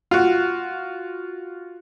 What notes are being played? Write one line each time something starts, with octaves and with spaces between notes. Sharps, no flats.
F4 F#4